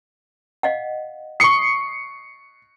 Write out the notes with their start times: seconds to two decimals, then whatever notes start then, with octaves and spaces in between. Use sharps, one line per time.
0.63 D#5 F5 F#5
1.40 C#6 D#6 C7 C#7